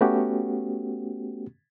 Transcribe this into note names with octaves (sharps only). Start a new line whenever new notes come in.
A3 B3 C#4 F#4 G4